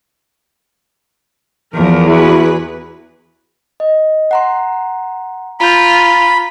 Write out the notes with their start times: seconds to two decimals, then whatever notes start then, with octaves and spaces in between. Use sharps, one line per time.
1.75 E2 F3 A#4
2.07 E4 F#4 G#4 B4
3.80 D#5
4.31 F#5 A#5 C6
5.60 F4 A#5 B5 G6